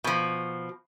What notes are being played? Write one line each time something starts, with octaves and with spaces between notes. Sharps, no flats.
B2 F3